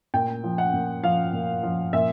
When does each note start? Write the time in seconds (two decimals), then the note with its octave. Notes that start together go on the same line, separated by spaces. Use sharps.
0.14 A#2 G5
0.44 F3
0.58 F#5
0.73 A#2
1.03 F3 F5
1.33 A#2
1.63 F3
1.93 A#2 E5